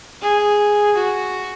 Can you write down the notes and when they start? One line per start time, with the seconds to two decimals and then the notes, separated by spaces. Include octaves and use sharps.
0.22 G#4
0.96 F#4